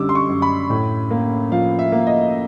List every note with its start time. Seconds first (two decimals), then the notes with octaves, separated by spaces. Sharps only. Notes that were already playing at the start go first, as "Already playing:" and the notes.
Already playing: F#2 D3 G3 D6 E6
0.09 C6
0.15 C#6
0.29 F#2
0.42 B5
0.70 A2
1.11 A#3
1.52 F3 F5
1.79 E5
1.92 A#3
2.07 D#5